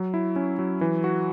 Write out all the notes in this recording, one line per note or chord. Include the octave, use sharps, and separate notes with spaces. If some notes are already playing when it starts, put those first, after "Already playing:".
Already playing: F#3
E4
C#4
F#3
E3
F#4